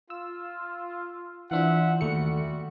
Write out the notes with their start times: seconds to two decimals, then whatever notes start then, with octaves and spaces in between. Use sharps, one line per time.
0.10 F4 E6
1.51 E3 D4 F4 C5 E5 F#5
2.01 D#2 G3 A3 F#4 C#7